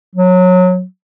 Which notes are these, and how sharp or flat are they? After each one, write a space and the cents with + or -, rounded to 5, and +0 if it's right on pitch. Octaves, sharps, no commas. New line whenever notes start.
F#3 -20